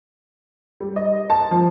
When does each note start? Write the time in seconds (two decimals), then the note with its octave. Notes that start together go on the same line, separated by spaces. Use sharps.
0.80 G3
0.96 D#5
1.30 A5
1.51 F3